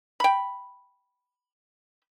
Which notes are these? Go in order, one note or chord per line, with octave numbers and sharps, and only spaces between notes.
G5 B5